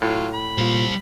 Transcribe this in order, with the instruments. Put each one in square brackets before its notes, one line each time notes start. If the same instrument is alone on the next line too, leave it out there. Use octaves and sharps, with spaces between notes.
[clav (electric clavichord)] A2 [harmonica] F#3 F4
[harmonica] B5
[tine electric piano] A#2 A#3 F4 [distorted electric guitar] G3 C5